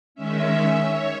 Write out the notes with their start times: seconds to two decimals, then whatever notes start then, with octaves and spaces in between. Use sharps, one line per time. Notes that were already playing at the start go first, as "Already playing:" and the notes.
0.15 D#3 G#3 C#4 E5
0.77 C#5